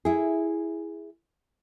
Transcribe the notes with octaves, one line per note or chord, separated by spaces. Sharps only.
E4 G#4